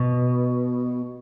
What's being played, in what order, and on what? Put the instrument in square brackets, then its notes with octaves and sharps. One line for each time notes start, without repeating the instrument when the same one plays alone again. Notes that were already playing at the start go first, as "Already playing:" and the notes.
Already playing: [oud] B2